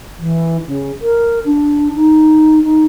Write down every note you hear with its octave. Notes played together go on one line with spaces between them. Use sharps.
E3
C#3
A#4
D4
D#4
D#4